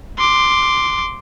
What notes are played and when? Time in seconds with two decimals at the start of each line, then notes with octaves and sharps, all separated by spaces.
0.18 C6 D6